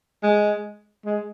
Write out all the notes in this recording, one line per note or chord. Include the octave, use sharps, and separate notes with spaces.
G#3
G#3